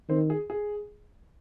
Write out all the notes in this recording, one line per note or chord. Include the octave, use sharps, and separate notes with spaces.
D#3 C4 C5
G#4
G#4